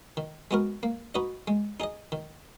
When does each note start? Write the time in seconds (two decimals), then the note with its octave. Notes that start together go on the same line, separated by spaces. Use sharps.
0.17 D#3
0.51 G#3 B3 F#4 A#4
0.83 A#3
1.15 D#4 F#4 B4 D#5
1.48 G#3
1.80 D#4 G#4 D#5
2.12 D#3